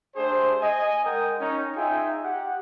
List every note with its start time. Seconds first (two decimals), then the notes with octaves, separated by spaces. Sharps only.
0.15 A3 D4 G4 G#4 C5
0.60 D#5 G#5
1.05 G#3 A#4 F#5 G5 D#6
1.40 C#4 D#4
1.76 D#4 F4 G#4 E5 G5 G#5
2.24 G4 F#5